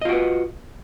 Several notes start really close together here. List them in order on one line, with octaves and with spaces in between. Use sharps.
D#5 F4 F#4 B4